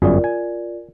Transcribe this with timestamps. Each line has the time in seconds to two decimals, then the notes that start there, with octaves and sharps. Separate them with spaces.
0.02 G1 F#2 F4 G#4 A#4 D5
0.24 G#5